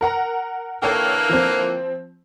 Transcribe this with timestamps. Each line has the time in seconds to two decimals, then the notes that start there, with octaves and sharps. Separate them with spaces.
0.01 A#4 F#5 A#5
0.82 D3 E3 A#3 A4 C#5 G5
1.29 F3 C4